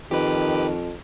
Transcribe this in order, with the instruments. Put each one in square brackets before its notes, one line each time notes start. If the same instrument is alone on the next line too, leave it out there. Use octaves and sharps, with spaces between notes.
[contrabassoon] F2 [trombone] D#3 [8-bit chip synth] G4 B4